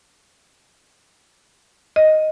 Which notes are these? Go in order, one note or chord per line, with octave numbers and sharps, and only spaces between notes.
D#5